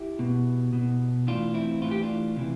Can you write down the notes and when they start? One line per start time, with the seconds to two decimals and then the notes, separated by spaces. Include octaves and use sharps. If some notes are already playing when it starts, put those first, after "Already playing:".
Already playing: E4 G4
0.19 B2
0.73 B2
1.27 A2 E3 D4 F4
1.54 C4 E4
1.82 A2 E3 F4
1.91 G4
2.02 D4 F4
2.36 C3 E3